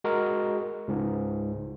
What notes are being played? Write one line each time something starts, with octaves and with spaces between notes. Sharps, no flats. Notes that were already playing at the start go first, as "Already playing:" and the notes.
G#3 F#4 A#4
C#2 G#2